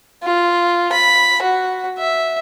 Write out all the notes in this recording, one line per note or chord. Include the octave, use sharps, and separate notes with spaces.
F4
B5
F#4
E5